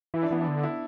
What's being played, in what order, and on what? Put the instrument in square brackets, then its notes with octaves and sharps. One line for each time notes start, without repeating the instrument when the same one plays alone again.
[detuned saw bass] E3 [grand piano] E4
[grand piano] D4
[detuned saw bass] E3 [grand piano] B3
[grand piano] D4
[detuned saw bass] D3
[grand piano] E4